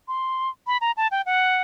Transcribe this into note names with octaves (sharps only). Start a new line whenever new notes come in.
C6
B5
A#5
A5
G5
F#5